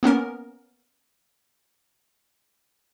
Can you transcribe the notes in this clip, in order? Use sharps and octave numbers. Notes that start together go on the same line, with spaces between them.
A#3 B3 C#4 A#4